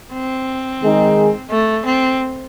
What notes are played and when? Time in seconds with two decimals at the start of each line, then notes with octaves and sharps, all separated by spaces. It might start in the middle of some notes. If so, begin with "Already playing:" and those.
0.13 C4
0.83 D#3 G#3 D#4 G#4
1.51 A3
1.86 C4